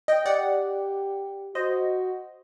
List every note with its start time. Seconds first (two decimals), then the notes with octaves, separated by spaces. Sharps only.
0.08 D#5 G5
0.25 G4 D5 F#5
1.54 F#4 C5 D#5